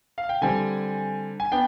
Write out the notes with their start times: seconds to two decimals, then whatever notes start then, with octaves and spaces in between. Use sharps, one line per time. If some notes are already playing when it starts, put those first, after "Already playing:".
0.18 F5
0.29 G5
0.41 D3 G3 C4 G#5
1.40 G#5
1.51 B3 D4 G5